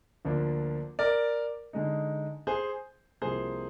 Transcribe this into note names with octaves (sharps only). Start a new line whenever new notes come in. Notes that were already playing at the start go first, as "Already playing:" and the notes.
D2 D3 F3 A#3 D4
A#4 D5
D3 G#3 D#4
G#4 C5
C2 C3 F3 A#3 G#4 C5